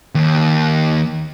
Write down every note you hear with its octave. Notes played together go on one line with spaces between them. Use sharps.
D#2